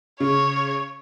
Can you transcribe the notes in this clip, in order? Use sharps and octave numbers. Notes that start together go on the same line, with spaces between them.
C#3 C#5